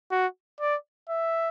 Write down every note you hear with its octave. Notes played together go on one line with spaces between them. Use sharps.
F#4
D5
E5